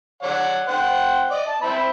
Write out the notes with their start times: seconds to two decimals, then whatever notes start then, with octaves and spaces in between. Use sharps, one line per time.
0.23 C#5 D5 F#5
0.68 C5 F#5 G5
1.31 D5 D#5
1.48 A5
1.62 C4 E5 B5